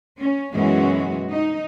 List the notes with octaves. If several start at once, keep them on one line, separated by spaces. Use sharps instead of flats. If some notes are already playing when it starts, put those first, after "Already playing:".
C#4
F#2 B2 E3 G#3 C#4 F#4
D#4